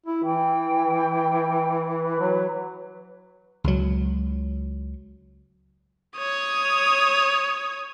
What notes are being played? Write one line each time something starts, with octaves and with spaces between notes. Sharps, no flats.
E4
E3 G5
B4
F#3
C#2 F#3
C#5 D#6